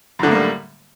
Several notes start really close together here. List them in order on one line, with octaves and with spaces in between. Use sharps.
F#2 D3 A2 A#3 G3